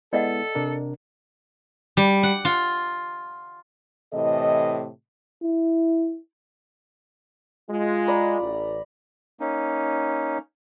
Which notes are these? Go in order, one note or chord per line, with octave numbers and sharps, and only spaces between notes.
G#3 B3 E4 A4 D5 D#5 F#5
C3 D4 A#4
G3
F#5
F4
A2 C3 E3 A4 D#5
E4
G#3 F4
D5 A#5 B5
A1
A#3 C#4 D#4